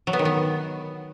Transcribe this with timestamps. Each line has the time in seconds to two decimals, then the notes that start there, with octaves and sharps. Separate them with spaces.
0.07 F#3
0.13 B3
0.19 D#3
0.25 B3